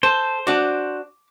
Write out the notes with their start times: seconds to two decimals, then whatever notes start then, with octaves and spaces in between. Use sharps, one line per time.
0.03 A4 C5
0.47 D4 F#4 D6